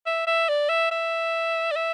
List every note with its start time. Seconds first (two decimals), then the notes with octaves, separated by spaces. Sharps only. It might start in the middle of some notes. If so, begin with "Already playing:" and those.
0.06 E5
0.27 E5
0.49 D5
0.69 E5
0.91 E5
1.71 D5
1.76 E5